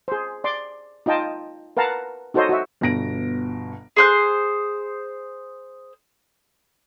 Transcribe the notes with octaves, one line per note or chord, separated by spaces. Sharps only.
G#4 C5
D5 C6 D6
D#4 F4 D#5 G5 A5
A#4 B4 F5 F#5 A5 A#5
D#4 F#4 A4 C5 C#5 D#5
F#4 E5
G1 B2 A#6 D7
G#4 C5 F#6